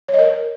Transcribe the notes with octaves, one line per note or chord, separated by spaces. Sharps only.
C#5
D#5
A#4